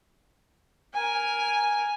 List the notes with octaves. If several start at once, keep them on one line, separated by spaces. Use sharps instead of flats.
A#4 G#5